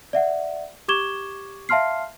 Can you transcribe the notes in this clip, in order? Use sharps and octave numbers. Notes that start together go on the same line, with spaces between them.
D5 E5 F#5
G4 C#6 D6 G#6 E7 G7
E5 F5 A5 C6 F6 C7